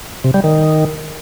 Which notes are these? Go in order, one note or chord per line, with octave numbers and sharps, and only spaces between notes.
C3
G3
D#3